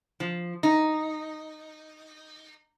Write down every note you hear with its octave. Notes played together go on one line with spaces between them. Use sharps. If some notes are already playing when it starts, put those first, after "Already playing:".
F3
D#4